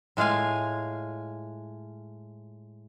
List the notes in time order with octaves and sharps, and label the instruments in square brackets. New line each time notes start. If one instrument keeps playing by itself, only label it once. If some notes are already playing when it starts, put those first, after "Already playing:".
[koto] A2 G#3 F4 F5 G#5